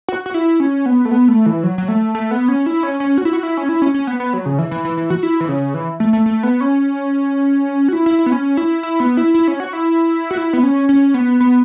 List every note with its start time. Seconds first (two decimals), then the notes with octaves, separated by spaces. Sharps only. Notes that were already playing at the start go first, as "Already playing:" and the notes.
0.09 F#4
0.26 F#4
0.34 E4
0.60 C#4
0.86 B3
1.05 A3
1.11 B3
1.28 A3
1.46 E3
1.63 F#3
1.78 F#3
1.88 A3
2.15 A3
2.31 B3
2.48 C#4
2.66 E4
2.83 C#4
3.00 C#4
3.18 F#4
3.25 E4
3.33 F#4
3.43 E4
3.57 C#4
3.69 E4
3.82 C#4
3.94 C#4
4.07 B3
4.20 B3
4.33 F#3
4.46 C#3
4.59 E3
4.71 E3
4.85 E3
4.97 E3
5.10 F#4
5.23 E4
5.40 E3
5.48 C#3
5.74 E3
6.00 A3
6.13 A3
6.26 A3
6.43 B3
6.61 C#4
7.88 F#4
7.93 E4
8.06 E4
8.19 E4
8.26 B3
8.32 C#4
8.57 E4
8.83 E4
9.00 B3
9.17 E4
9.34 E4
9.48 C#4
9.60 F#4
9.73 E4
10.31 F#4
10.37 E4
10.53 B3
10.63 C#4
10.89 C#4
11.14 B3
11.41 B3